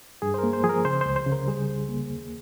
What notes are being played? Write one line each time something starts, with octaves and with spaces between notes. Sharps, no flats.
G2 G#4
C5
A#4
A#3
C5
F3 G#4
A#4
C#3 C5
C#2 C5
C5
C#3
A#4
G3 G#4
C2
A#3
D#2